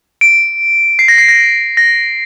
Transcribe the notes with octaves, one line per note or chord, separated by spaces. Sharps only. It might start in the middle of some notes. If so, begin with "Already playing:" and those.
D7
C7
A#6
C7
A#6
A#6